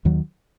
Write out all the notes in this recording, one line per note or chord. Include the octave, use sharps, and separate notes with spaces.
D#2 D#3 F#3